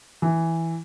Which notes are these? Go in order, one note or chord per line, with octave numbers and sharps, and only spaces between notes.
E3